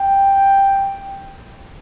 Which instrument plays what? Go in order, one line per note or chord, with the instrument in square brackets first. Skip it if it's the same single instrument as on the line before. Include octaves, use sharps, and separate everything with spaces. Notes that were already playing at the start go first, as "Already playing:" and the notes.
Already playing: [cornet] G5